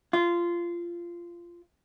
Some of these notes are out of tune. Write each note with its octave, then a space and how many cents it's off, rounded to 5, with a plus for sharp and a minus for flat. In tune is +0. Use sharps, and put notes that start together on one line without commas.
F4 -15